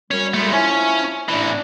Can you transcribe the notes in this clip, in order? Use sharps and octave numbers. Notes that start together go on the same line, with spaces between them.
F#2 G3 C#4
G#3 A3
F3 C#4 E4 G#5
A2 E3 D4